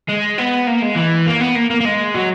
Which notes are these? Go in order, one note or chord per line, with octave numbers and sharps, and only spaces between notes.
G#3
B3
A#3
G#3
E3
A#3
B3
A#3
A#3
A#3
G#3
F#3